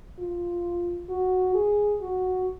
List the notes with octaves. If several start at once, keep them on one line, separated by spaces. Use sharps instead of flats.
F4
F#4
G#4
F#4